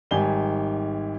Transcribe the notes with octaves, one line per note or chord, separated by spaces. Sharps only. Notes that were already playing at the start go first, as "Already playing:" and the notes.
G#1 G#2 G3 G4 G#5 G7